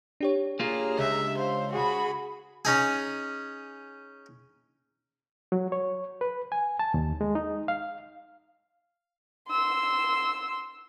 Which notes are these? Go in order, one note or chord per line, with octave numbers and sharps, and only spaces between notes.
D4 G4 C#5
A#3 F4 G#4 A#5
C#2 E5
C5 F5
F#4 G#4 B5
C#4 D#4 G#4
F#3
C#5
B4
G#5
A5
D#2
G#3
D#4
F5
C6 E6